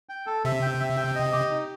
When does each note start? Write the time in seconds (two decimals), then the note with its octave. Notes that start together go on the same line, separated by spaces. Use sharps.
0.09 G5
0.26 A4
0.45 C3 E5
0.62 G5
0.80 E5
0.97 G5
1.15 D#5
1.32 G4
1.50 D#4